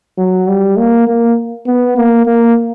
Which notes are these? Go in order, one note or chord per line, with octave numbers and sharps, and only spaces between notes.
F#3
G3
A#3
A#3
B3
A#3
A#3